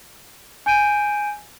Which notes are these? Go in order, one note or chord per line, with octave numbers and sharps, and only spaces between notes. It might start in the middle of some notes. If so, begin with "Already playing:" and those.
G#5 G6 D7 D#7